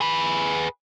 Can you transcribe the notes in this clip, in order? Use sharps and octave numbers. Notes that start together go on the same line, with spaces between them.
G#4 B4